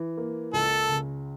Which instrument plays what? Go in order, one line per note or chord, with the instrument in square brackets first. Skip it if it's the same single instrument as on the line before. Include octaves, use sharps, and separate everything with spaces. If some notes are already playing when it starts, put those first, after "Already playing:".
Already playing: [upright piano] E3
A#3
[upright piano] C#2 [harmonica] A4
[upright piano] C#3